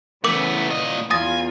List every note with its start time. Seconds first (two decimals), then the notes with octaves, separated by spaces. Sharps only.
0.24 C#3 E3 A3 B3 A#4 D6
0.71 A#2 D#5
1.11 E2 F4 G#5 D#6 A6 A#6